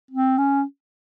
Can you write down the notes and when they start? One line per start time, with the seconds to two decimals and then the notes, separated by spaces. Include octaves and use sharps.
0.11 C4
0.38 C#4